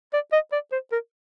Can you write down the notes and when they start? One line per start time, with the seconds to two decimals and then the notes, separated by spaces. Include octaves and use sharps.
0.13 D5
0.33 D#5
0.52 D5
0.72 C5
0.92 A#4